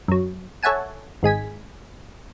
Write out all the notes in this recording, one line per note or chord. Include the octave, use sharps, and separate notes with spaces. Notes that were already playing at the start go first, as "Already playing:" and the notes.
F#2 F#3
A4 C#5 E5 F#5 G#5 A5
G#1 G#3 G#5 B6